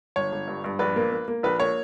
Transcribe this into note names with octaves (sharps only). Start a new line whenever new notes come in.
G1 C#5
G1
G2
G2
A#1 B4
A#3
A#3
A#3
A#1 B4
A#3 C#5